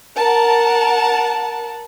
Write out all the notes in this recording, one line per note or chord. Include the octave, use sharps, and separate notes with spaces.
A#4 F#5 A5